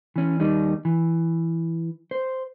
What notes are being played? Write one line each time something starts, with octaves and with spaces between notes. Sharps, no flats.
E3 C#4
D#2 G3 D#4
E3
C5